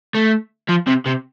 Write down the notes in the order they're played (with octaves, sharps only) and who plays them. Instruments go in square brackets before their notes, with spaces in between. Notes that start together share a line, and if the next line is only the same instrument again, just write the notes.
[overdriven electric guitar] A3
F3
C3
C3